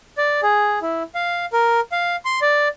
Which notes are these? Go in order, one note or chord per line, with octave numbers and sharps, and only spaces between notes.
D5
G#4
E4
F5
A#4
F5
C6
D5